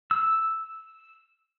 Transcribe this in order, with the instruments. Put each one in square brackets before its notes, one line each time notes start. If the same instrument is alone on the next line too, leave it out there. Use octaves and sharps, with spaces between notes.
[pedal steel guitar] E6